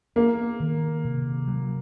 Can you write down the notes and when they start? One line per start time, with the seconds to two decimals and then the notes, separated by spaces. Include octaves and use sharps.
0.16 A#3 B3
0.60 D#3
1.04 C3
1.48 F#3